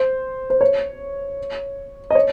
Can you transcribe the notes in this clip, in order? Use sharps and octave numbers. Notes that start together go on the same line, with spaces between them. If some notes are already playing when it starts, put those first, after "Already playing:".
Already playing: C5
C5
C#5
D#5
C#5